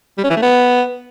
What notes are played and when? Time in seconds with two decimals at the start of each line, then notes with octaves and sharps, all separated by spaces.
0.18 G3
0.24 C#4
0.30 E3
0.36 A3
0.42 B3